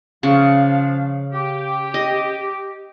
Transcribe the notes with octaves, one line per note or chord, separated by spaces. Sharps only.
C#3 F3 D4 F5
G4
D#5